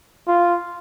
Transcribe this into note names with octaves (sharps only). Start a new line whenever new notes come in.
F4